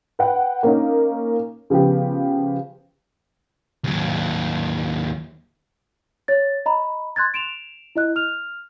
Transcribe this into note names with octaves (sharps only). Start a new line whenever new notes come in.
B4 F#5 G5
A#3 C#4 D#4
C#3 F3 B3 G4
D#2 F#3
C#5 A6
D#5 A#5 B5
C6 F#6 G#6 A6
D7 E7 F7
E4 D#5 F#6
F6 F7